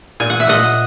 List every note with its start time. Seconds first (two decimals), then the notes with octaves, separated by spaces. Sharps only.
0.20 A#2 G#5
0.30 F#5
0.40 E5
0.47 A#2 D#5 F#5